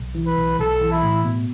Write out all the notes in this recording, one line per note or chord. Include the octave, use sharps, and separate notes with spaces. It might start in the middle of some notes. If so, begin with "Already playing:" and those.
Already playing: B1
E3
B4
B1
B1 A4
E3
E4
A2
B2